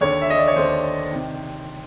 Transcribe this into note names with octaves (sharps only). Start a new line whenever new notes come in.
D#2 D3 C#5
E5
D#5
D5
C#5
D#2 D3 C5
C3 D#3